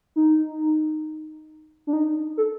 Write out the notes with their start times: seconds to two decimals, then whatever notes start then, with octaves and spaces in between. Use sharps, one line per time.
0.16 D#4
1.87 D4
1.93 D#4
2.37 A4